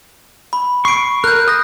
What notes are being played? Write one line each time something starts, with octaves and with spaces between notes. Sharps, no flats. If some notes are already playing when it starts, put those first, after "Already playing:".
B5
C#6 C7 D7
A#4 F#6 G6
D#6 F#6 A#6